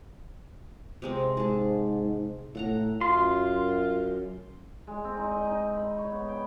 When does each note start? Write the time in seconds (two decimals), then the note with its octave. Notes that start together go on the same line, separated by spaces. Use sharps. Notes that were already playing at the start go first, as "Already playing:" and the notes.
1.02 C3 G#3 C4
1.37 G#2 G#4 A5
2.55 A2 A4 F#5 A#5
3.01 F#2 F4 C6
4.87 G#3
5.04 C4
5.17 D#4
5.31 D#5
5.45 D#4
5.76 B5
5.98 C#5
6.12 B3
6.28 G5